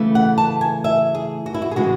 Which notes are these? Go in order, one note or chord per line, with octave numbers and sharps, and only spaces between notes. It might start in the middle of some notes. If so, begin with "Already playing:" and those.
Already playing: C#3 E3 A3
F#5
A5
G#5
E5
G#4
F#4
E4
F#4
G#4
C#3 E3 G#3 F#4